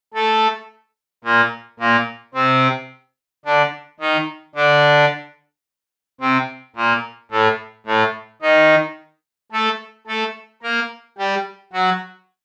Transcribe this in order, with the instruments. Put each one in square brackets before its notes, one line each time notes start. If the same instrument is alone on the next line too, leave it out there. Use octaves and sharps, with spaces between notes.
[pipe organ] A3 A4
A#2 A#3
A#2 A#3
C3 C4
D3 D4
D#3 D#4
D3 D4
C3 C4
A#2 A#3
A2 A3
A2 A3
D#3 D#4
A3 A4
A3 A4
A#3 A#4
G3 G4
F#3 F#4